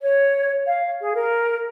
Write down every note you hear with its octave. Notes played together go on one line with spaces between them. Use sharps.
C#5
F5
G#4
A#4